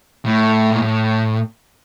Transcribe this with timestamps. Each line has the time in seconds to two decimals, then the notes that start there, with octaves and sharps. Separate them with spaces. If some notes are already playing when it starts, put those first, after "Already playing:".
0.25 A2
0.71 A#2
0.82 A2